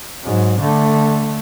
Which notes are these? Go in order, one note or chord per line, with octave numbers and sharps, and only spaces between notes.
G#2 F#3
D3 A3